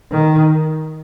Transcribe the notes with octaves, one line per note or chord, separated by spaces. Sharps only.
D#3